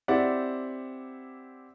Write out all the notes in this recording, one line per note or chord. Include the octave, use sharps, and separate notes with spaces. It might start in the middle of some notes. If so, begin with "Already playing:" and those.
C4 E4 G4 D5 F#5